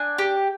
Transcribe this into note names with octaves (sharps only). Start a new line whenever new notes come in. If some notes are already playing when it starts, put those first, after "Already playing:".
Already playing: D4 G#5
G4